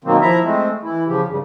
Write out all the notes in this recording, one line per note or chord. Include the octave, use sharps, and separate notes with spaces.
B2 D#3 F#3 A#3 C4
F3 E4 E5 A#5
G#3 A3 C4
E3 E4
C#3 F3 G4
G2 C#3